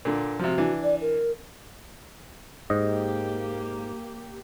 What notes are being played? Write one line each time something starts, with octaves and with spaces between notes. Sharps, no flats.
A#2 D3
C3 F3 F#4
E3 D4
D5
A#4
G#2 A#3 G4 D#5